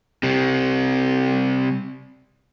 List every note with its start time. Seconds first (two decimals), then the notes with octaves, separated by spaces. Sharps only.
0.23 C3 G3